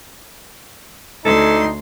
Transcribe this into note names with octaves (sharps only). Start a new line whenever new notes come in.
D2 D#4 A4 C6